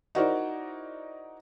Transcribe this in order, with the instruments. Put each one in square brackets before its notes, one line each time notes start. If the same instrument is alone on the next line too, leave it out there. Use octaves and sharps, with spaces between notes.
[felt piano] D#4 E4 F#4 A#4 C5 D5